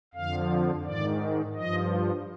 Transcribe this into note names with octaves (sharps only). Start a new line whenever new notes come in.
F2 D3 F3 F5
G#2 D#3 D5
G2 F3 D#5